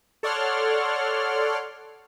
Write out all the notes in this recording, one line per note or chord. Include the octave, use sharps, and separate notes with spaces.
A4 C#5 D5 F#5 C6 F6